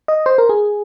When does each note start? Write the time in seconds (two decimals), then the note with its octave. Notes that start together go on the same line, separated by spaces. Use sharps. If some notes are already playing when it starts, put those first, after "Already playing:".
0.08 D#5
0.26 C5
0.38 A#4
0.49 G#4